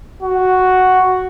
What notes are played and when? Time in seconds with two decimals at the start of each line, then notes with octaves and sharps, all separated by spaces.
0.23 F#4